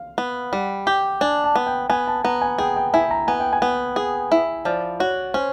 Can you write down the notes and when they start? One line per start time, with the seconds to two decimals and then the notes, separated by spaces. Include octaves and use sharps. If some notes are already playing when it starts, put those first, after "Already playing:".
Already playing: F5
0.18 B3
0.52 G3 F#5
0.87 G4 G5
1.21 D4 G#5
1.44 A5
1.56 B3
1.66 G5
1.89 B3 G#5
2.08 A5
2.24 B3 A#5
2.41 G#5
2.58 G#4 G5
2.76 G5
2.94 E4 G#5
3.11 A#5
3.28 B3 G#5
3.40 G5
3.53 G#5
3.62 B3
3.96 G#4
4.32 E4
4.65 F3 D5
5.00 F#4 C#5
5.34 C#4 C5